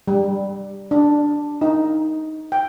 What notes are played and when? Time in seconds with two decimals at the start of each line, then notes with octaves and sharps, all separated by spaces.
0.08 G3
0.91 D4
1.61 D#4
2.52 G5